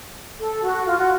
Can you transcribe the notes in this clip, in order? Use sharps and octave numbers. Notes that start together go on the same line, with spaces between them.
A4
F#4
F4
F#4